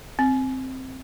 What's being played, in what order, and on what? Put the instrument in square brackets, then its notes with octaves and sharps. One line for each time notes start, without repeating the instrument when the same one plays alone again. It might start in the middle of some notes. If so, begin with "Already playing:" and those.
[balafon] C4